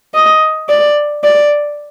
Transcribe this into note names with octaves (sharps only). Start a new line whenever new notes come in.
D#5
D5
D5